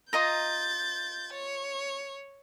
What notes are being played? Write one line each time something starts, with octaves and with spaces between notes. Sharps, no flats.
F4 D#5 A#5 G6 A6
C#5